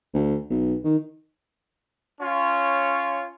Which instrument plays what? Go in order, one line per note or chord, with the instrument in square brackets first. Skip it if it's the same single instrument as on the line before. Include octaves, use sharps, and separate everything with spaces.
[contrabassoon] D2
B1
D#3
[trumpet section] C#4 F4 C#5